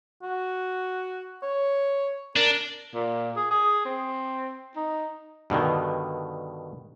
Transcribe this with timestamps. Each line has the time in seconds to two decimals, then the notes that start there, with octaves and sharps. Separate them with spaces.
0.22 F#4
1.43 C#5
2.36 D4 A#4
2.95 A#2
3.36 G#4
3.51 G#4
3.85 C4
4.76 D#4
5.50 G2 B2 D3 D#3